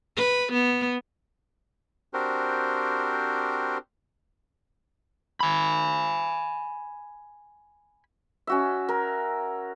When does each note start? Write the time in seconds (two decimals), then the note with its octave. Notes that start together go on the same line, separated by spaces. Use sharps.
0.17 B4
0.53 B3
2.13 C4 D4 F#4 G4 A#4 C5
5.41 G#5 B5
8.47 C#4 F#4 E5
8.89 A#4